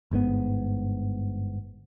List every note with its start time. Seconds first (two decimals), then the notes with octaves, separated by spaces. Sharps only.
0.11 G1 G#2 C#3 B3